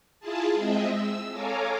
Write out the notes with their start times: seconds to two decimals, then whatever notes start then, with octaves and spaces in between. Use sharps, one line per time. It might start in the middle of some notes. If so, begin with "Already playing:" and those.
0.20 E4 F4 G#4 A5
0.54 G#3 C4 D#5 E5
0.87 E6
1.32 A4 C#5 F5 G#5 A#5 D6